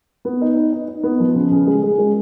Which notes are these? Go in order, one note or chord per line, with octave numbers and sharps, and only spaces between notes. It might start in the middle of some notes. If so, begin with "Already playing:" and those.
B3
D#4
D#4
D#4
D#4
B3
F3
C#3
C#3
G#3
G#3
G#3